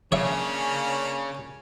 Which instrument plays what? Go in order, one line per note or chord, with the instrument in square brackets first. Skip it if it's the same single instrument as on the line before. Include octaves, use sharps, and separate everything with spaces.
[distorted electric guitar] C#3 [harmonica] A#3 C#4 D4 [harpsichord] C#5 E5